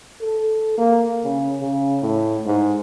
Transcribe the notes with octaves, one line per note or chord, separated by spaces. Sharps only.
A4
A#3
C#3
C#3
A2
G#2